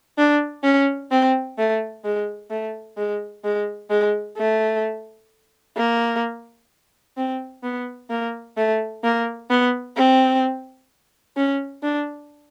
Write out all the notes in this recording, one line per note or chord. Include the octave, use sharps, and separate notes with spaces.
D4
C#4
C4
A3
G#3
A3
G#3
G#3
G#3
A3
A#3
C4
B3
A#3
A3
A#3
B3
C4
C#4
D4